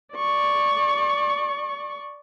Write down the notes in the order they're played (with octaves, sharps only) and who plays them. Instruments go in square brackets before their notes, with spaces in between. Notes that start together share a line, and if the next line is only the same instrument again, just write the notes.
[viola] D5 C#6